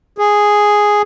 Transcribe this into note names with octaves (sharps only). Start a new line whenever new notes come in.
G#4